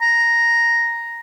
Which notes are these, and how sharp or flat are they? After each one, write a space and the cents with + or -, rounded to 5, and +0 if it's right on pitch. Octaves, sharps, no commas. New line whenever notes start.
A#5 +0